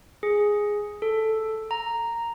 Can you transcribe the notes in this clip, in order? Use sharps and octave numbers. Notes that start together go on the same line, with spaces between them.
G#4
A4
A#5